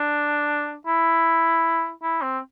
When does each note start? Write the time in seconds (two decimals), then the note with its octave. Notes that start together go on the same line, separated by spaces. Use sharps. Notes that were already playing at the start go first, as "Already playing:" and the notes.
Already playing: D4
0.87 E4
2.02 E4
2.22 C4